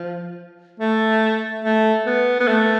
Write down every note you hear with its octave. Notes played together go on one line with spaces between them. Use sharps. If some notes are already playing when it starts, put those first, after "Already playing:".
Already playing: F3
A3
A3
B3
B3
A3